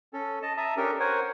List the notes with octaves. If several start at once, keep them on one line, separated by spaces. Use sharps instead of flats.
C#4 A4
D#5 A5
E5 A5 A#5 D#6
C#4 D4 G4 A4 A#4
A#4 C5 C#5 F#5 G#5